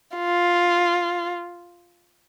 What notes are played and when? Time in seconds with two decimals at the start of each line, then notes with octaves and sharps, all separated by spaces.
0.17 F4